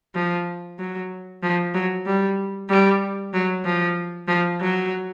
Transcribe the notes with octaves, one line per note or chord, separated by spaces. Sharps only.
F3
F#3
F3
F#3
G3
G3
F#3
F3
F3
F#3